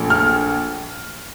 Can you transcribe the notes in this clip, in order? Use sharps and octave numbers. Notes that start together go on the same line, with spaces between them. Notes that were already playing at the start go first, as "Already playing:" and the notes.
Already playing: A#1 A#2 A3
F6